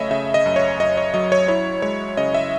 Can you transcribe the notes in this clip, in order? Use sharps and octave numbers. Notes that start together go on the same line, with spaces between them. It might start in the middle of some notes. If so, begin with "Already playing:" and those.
Already playing: F#2 C#3 A3 C#5 D#5 E5 B5
C#3 E5
D#5
F#2
C#5
F#2 D#5
C#5
F#3 D#5
C#5
E4 C#5
G#3 C#5
C#3 D#5
E5